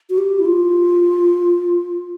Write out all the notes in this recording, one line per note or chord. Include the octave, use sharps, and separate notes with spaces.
F#4
G4
E4
F4